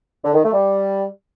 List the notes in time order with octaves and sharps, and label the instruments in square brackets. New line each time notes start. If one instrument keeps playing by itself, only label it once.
[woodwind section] D3
D#3
A3
G3